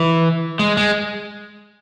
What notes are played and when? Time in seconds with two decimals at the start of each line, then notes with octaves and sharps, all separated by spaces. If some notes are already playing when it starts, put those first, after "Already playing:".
Already playing: E3
0.59 G#3
0.77 G#3